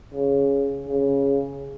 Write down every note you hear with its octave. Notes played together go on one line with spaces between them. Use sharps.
C#3
C#3